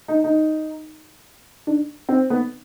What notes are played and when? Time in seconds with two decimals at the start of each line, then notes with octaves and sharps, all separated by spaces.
0.08 D#4
0.24 D#4
1.67 D4
2.09 C4
2.30 B3